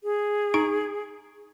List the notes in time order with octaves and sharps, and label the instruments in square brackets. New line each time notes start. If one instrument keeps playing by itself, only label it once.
[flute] G#4
[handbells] D#4 C#6 D7